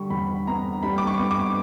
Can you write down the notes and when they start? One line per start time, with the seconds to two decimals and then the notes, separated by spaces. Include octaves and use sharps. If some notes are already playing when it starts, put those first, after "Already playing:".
Already playing: D3 G3 C#6
0.10 E2 B5
0.47 B3 A#5
0.83 G3 B5
0.98 D6
1.07 C#6
1.19 B3
1.31 D6